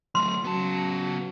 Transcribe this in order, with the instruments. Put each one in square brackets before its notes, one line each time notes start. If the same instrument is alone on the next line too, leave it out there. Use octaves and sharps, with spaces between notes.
[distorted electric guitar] F#3 A3 [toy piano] C6
[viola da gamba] C#3 F#3 [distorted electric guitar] B3 A5